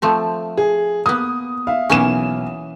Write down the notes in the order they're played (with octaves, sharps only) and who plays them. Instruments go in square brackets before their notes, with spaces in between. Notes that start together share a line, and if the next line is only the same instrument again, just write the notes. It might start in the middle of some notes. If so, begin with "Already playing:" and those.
[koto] F3 A3 C4
[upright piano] G#4
[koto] A#3 B3 [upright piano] D#6
[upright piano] E5 F5
[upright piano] B1 E7 [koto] E3 A#3 C#4